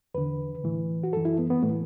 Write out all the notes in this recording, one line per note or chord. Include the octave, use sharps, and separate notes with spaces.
E2 D3 B4
A2 E3
F#4
F#2 E3 A4
E4
B3
B3
A2 E3 A3